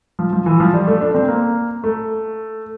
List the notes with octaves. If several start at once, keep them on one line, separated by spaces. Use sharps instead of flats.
F3
F3
E3
F3
G3
A3
D4
C4
A#3
A3